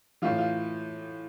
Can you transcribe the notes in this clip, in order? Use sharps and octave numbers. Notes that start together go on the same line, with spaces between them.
A2 E3 F4
F4